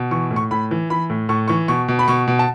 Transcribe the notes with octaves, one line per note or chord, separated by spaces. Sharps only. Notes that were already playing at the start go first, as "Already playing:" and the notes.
Already playing: B2
E3 C#6
A2
C#6
A2 B5
E3
E3 B5
A2
A2 C#6
E3 C#6
B2 C#6
B2
B5
B2 C#6
B2
A5